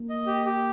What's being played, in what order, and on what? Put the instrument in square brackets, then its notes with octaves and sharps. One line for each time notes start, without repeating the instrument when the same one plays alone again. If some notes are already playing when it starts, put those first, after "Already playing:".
Already playing: [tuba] A#3
[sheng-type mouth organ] D#5
G4
G4